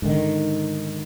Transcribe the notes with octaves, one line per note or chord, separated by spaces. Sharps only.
G#2 D3 D#3